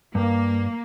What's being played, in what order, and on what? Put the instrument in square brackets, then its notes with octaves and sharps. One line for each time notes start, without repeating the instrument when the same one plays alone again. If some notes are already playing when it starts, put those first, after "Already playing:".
[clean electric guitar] G2 [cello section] A#3